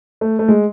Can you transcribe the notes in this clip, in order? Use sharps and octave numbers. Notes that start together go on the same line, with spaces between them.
A3
A3
G#3